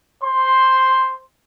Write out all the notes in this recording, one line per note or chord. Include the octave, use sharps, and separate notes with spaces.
C5 C6